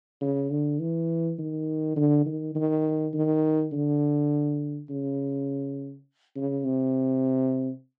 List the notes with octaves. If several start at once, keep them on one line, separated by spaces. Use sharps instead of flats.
C#3
D3
E3
D#3
D3
D#3
D#3
D#3
D3
C#3
C#3
C3